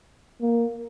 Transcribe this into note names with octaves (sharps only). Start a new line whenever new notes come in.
A#3